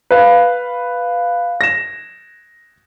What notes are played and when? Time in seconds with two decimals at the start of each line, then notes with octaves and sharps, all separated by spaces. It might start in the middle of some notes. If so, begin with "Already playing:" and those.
0.11 B4 F5
1.61 A#6 E7